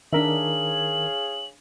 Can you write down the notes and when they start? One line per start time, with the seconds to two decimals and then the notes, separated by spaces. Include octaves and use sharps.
0.13 D#3 D4 G#4 A#4 C#5 E5 F5 F#7